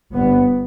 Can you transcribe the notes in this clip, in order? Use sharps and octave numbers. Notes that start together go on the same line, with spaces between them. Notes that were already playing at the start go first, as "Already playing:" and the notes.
G1 G2 B3